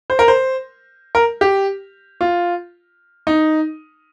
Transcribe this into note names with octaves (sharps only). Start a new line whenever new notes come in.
C5
A#4
C5
A#4
G4
F4
D#4